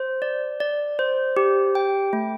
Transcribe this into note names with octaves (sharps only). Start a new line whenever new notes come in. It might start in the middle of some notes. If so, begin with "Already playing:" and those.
Already playing: C5
D5
D5
C5
G4
G5
A3